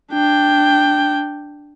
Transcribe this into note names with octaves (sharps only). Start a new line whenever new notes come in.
D4 G5